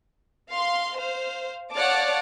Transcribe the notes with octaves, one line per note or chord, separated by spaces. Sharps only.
F5 C6
C5 F5
C#5 D5 F5 F#5 A5 D6